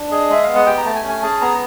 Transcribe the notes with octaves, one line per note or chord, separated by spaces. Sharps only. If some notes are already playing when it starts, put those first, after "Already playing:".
Already playing: D4
G#4 D#5
G#3 E5
B3 F5
F#5
G4 G5
A#5
A3 A5
G#5
C#4
G#5
G#4 A5
B3 A#5